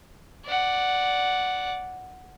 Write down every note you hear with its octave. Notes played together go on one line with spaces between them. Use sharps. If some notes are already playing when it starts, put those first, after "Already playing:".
D5 F#5